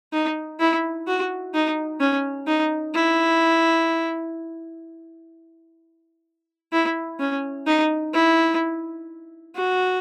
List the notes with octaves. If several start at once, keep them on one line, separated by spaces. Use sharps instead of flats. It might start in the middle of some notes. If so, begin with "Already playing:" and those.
D#4
E4
F#4
D#4
C#4
D#4
E4
E4
C#4
D#4
E4
F#4